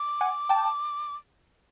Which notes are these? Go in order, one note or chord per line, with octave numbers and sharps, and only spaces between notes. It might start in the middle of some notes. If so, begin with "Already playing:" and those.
Already playing: D6
F#5 G#5
G5 A5